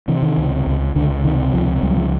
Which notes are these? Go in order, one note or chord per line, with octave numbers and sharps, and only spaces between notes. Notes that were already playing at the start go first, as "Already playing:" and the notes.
C3 E3
D#3
C#2
C#2
C#2 D3
C3 D#3
C#2 F3
C#2 G3
F#3
F3